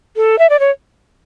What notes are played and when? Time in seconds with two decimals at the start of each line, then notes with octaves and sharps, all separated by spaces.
0.16 A4
0.39 E5
0.50 D5
0.60 C#5